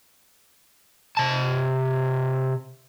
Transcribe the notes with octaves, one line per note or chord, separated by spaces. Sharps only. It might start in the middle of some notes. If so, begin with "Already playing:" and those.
C3 A5